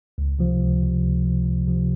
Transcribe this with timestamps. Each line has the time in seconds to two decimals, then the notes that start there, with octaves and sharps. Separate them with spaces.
0.18 C#2
0.39 C3 F3
0.60 C#2
0.82 C3 F3
1.03 C#2
1.25 C3 F3
1.45 C#2
1.67 C3 F3